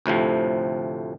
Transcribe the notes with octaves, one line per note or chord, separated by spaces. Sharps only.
D2 A2 C3 F3